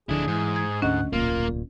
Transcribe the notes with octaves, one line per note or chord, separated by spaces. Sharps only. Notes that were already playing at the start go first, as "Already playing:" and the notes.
D1 D3 F3 D4 E4 G#4
G#2 E3
G#6
D2 C#4 D4 D#5 F#5
D1 B1 A#2 A#3 F4